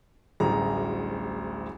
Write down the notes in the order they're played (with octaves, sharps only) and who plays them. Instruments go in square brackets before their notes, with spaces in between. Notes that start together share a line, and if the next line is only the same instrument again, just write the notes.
[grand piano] D1 A1 D2 G3 G#4 A#5